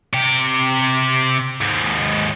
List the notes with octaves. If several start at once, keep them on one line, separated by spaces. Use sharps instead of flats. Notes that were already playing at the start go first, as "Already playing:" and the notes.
C3 G4
D#2 G#2